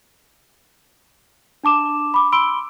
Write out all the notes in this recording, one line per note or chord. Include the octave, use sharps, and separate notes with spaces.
D4 A5 D6 E7
B5 D6
B5 C6 E6 D7 G7